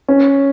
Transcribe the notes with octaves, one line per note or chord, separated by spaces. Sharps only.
C#4